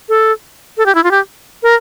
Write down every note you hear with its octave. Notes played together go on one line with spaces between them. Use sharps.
A4
A4
G4
E4
F4
G4
A#4